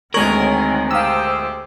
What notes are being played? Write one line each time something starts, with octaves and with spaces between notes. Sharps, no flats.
D2 D#3 G#3 C4 A#4 C#5 G#5 F#7
G4 C5 F5 D#6 E6